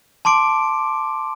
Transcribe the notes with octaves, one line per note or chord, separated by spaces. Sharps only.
A5 C6 D6 D7